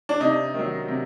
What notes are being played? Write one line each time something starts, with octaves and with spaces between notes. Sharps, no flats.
D4
C3 D#4
D#3 F#3
C3